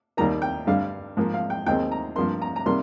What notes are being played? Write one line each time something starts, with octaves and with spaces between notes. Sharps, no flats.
D#2 D#3 G3 A#3 A#5
G5
G2 D3 G3 F5
G#2 F3 A#3
F5
G5
D#2 D#3 G#3 C4 G5
A#5
G2 F3 A#3 C6
A#5
A#5
C3 D#3 G3 A#3 C6